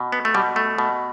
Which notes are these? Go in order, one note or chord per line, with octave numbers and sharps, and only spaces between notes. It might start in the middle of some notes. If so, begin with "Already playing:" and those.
Already playing: B2
B3
A3
B2 G3
A3
B2